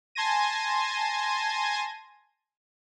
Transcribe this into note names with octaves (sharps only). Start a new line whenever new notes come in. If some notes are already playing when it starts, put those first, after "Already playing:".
G#5 A5 C6 G#6 A#6 D#7